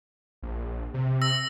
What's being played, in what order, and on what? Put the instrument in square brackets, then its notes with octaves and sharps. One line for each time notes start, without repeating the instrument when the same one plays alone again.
[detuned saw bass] A#1
C3
[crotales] E6 A#6